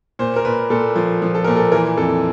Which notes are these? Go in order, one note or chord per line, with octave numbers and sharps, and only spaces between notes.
A#2 C5
A#4
A#2 B4
A#2 A4
F3
F3
A4
A#2 A#4
A4
E3 A#4
F2 A4